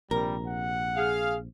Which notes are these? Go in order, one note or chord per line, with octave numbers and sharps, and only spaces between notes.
A#1 C3 G3 A#4
F#5
G#4 F5